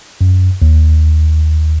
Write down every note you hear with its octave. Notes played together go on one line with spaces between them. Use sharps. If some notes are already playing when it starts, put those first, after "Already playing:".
F#2
D#2